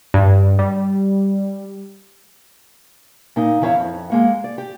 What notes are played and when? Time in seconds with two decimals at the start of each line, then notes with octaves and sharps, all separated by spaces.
0.14 G2
0.59 G3
3.36 A#2 D#4 F5
3.62 E2 C#4 E4 C#5 F5
3.80 F2
4.10 G#3 A#3 F#5
4.44 D5
4.58 G4